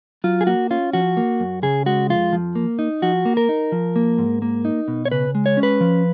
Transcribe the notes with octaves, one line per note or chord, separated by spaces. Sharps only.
F#3 F4
G#4
A#3 F#4
C#4 F4
F3 F#4
A#3
F#2
C#3 G#4
G#3 F#4
F2 F4
F3
A#3
D#4
F3 F#4
A#3
A#4
D#4
F3
A#3
G#2
A#3
D#4
B2
C#5
C#3 B4
G#3
C#5
C#4
B4
F3